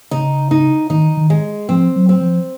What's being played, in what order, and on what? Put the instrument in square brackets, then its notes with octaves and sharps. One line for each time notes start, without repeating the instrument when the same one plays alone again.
[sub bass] C#3 [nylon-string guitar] D#4
[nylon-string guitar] D#4
[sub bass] D#3 [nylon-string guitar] D#4
[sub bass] D#3
[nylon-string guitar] G#3
[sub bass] F3 [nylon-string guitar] C4
[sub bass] F#3
[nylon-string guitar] C4
[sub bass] F3